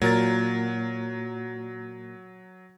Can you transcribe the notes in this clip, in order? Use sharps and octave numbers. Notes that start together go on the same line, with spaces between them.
A#2 F#3 A#4 A6